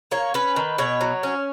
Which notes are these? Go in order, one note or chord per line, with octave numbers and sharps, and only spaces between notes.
A#3 C#5
C#4 B4
D#3
B2 C#5
F#3
C#4